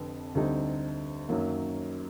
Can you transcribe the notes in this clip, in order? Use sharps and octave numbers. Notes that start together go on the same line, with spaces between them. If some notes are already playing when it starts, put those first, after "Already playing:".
Already playing: F1 F2 D3
D2 D3 G3 C4 D#4
F#2 D#3 F#3 A#3